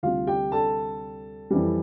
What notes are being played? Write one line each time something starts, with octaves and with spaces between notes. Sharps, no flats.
D2 C3 G3 F4 F5
G4 G5
A4 A5
F2 E3 G3